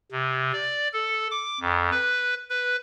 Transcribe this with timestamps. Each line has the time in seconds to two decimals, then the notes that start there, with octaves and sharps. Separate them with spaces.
0.12 C3
0.53 D5
0.93 A4
1.31 D6
1.60 F2
1.92 B4
2.50 B4